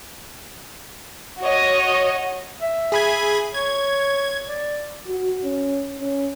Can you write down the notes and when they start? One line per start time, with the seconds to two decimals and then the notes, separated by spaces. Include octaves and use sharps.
1.41 F#4 C#5 D#5
2.61 E5
2.92 G#4 B5 G#6
3.54 C#5 G#6
4.46 D5
5.08 F#4
5.44 C#4
6.00 C#4